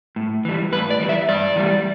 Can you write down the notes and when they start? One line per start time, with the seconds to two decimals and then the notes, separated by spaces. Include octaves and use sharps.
0.16 A2
0.45 E3 G3
0.72 A2 B4
0.90 D5
1.00 E3 G3
1.09 E5
1.29 G2 D5
1.56 E3 G3